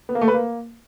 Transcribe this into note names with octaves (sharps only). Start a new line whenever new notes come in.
B3
A#3
A3
B4
A#3